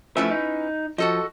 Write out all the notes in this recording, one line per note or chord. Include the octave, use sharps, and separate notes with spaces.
F3 A3 C#4 E4 B4 E5
D#4
F3 F#4 A4 D#5